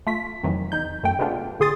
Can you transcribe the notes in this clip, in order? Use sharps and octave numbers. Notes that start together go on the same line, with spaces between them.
A3 F4 B6
F2 C3 D#3 E3 F#3
E2 D#4 G6
F#2 A3 G5
C3 G#3 A3 B3 D4 F4
A1 D3 G#4 C6 D#6 A6